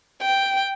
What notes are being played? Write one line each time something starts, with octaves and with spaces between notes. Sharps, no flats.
G5